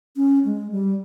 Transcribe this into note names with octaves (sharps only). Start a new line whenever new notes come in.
C#4
G#3
G3